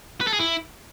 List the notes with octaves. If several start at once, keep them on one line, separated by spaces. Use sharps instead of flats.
B4
A4
G#4
E4